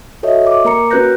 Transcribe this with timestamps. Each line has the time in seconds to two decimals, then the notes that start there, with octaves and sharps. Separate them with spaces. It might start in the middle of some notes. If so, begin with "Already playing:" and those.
0.23 F#4 A4 C#5 D#5 E5
0.47 D6
0.65 A#3 A#4 A#5 C#7
0.91 C#4 F#4 B4 F#6 G6 A#6